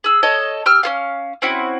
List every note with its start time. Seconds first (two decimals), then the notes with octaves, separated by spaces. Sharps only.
0.04 G#4 E6
0.23 A4 C#5 D#5 A5
0.66 G4 E6 F6
0.83 C#4 G#4 F5
1.42 C4 C#4 E4 F#4